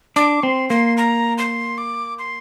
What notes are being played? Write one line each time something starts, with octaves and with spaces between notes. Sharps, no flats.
D4 D6
C4 C6
A#3 C6
A#5
C6
D6
C6